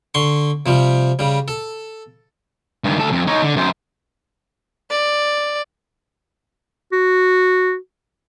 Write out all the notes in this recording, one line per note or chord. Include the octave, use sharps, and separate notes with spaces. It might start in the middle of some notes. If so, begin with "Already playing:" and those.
D3 C6 C#6
C3 F3 G3
C#3 G3
A4
G2 D#3
D2 A4
F2
D#4 C#5
D3
F#2 C5
D5
F#4